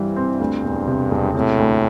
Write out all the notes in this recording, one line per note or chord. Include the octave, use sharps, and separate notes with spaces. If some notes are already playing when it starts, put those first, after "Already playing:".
Already playing: G2 C3 E3 G3
C4
D2 G2
E1
C3
E1
A2 C3
D2